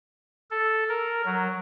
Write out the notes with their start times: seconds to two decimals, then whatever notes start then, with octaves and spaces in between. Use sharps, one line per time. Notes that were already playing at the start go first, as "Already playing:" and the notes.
0.51 A4
0.89 A#4
1.25 F#3